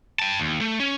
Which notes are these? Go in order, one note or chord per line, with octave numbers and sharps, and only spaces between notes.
G5 A5
D#2
A3
C#4